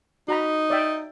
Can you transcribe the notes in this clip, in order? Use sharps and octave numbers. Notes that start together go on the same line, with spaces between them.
D#4 F#4 A#5 B5
D5 E5 G5